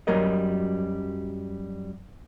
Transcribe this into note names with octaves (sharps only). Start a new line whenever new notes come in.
F#2 F#3 G3 A#4 D#5